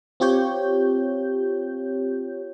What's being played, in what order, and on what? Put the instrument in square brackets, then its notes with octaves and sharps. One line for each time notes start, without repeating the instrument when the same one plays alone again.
[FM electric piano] C4 F4 G4 C#5 G6